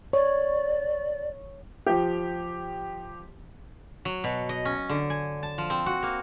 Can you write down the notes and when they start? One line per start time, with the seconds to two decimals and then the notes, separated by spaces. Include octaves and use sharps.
0.13 C#5 D5
1.86 F3 G4
4.05 F#3
4.24 B2
4.49 D#5
4.65 C#4
4.89 D3
5.10 G#5
5.43 A5
5.58 F3
5.70 C4
5.86 F#4
6.03 A#3